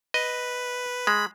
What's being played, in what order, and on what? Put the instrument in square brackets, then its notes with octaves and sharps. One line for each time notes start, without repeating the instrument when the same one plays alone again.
[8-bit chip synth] B4 [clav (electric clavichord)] D#5
[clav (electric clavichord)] G#3 [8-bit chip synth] B5